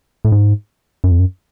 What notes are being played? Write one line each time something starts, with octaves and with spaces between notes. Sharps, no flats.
A2
G#2
F#2
F2
F#2